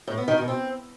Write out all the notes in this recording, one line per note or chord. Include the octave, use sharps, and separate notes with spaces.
A2
B3
D#3
B2
C4